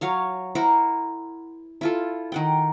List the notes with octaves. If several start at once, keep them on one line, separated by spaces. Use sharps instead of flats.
F#3 C#5 F5
E4 A#4 C5 F#5
E4 F4 A4
D#3 F#5 G5